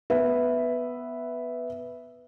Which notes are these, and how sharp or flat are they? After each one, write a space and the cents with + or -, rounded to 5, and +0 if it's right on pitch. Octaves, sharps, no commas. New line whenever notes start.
B3 +0 B4 +0 E5 +0